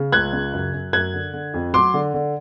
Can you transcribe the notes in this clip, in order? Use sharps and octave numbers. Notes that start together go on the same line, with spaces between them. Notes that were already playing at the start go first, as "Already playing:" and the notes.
Already playing: C#3
C#2 F#6 G#6
C#3
F#2
F#2
F#2 F#6 G#6
D3
D3
F2
F#3 C6 D6
D3
D3